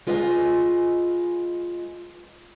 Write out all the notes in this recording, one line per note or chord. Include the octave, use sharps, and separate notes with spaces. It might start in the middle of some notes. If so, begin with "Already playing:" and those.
G#3 F4 B4 D#5 E5 G#5